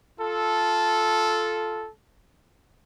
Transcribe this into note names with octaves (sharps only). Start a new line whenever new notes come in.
F4 A4